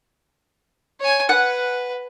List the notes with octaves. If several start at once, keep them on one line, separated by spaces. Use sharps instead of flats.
C#5 G#5
B4 F#5